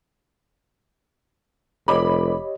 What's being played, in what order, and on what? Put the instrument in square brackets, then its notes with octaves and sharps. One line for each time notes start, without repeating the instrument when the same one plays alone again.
[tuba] F1 [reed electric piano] G4 C#5 D#5 [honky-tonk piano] B5 D6